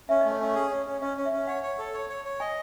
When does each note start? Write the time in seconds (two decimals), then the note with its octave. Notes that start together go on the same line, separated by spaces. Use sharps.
0.09 C#4 E5
0.21 A3 D#5
0.32 C#5
0.40 C#4 D#5
0.55 G#4
0.71 C#4
0.86 C#4
1.01 C#4 D#5
1.17 C#4
1.25 E5
1.32 C#4
1.47 C#5 F#5
1.63 C#5
1.79 A4
1.94 C#5
2.09 C#5
2.25 C#5
2.40 D#5 G#5